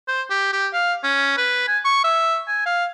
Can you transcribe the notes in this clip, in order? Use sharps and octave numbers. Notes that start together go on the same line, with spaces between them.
C5
G4
G4
F5
C#4
B4
G#5
C#6
E5
G#5
F5